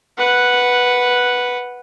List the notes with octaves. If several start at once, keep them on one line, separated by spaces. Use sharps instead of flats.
B4 F#5